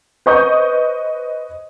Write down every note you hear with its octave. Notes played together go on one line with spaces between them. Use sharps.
B4 C5 D#5 C#6 D#6 G6